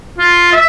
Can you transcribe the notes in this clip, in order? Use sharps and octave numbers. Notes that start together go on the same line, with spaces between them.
F4
E5